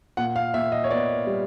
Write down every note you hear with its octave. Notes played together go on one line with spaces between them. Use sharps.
A#2 F#5
F5
A#2 E5
D#5
C#5
B3 D5
G3